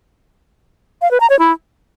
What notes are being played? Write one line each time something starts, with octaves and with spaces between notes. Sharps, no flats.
F5
B4
A#5
C#5
E4